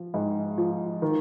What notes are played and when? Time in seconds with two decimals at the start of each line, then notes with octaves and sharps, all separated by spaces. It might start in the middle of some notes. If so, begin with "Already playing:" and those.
Already playing: F3
0.14 G#2
0.58 F3
1.02 D#3